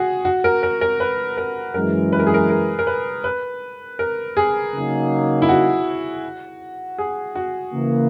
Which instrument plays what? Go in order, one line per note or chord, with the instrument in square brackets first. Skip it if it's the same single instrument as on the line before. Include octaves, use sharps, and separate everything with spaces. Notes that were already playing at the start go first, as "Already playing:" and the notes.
Already playing: [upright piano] F#4 G#4
F#4
A#4
A#4
A#4
B4
A#4
[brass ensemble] F#2 E3 G#3 [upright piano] A#4
[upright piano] B4
A#4
G#4
A#4
A#4
A#4
B4
B4
A#4
G#4
[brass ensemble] C#3 F#3 A#3 D#4
[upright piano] E4
F#4
G#4
F#4
[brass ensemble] C#3 E3 A#3